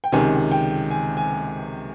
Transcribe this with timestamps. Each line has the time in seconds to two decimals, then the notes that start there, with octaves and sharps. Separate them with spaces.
0.04 G5
0.12 C#2 C3 D#3 G#5
0.52 G5
0.91 G#5
1.17 G#5